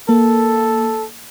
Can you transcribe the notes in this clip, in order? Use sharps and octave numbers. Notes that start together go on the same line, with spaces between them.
A#3 A4